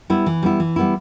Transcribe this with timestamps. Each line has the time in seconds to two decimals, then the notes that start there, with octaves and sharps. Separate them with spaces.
0.10 G3 B3 E4
0.26 E3
0.43 G3 B3 E4
0.60 E3
0.76 G3 B3 E4